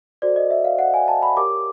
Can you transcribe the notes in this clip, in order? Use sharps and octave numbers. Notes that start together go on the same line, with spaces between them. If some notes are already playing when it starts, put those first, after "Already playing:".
F#4 A4 C5 D5
D#5
E5
F5
F#5
G#5
A5
B5
G4 A#4 C#5 D6